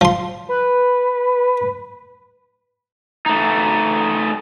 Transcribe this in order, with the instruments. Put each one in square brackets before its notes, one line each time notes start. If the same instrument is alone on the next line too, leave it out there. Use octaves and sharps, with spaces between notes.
[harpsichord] F3 C6
[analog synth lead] B4
[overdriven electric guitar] A3 D#4